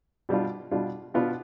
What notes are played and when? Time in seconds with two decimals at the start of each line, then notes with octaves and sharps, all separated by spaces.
0.29 B2 G3 D4 F4
0.71 B2 G3 D4 F4
1.14 B2 B3 D4 F4